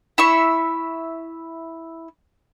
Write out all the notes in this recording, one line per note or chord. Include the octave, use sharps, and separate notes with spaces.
E4 E5 C#6